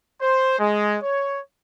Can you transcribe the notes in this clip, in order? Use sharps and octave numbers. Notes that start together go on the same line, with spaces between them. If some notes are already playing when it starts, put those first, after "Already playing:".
C5
G#3
C#5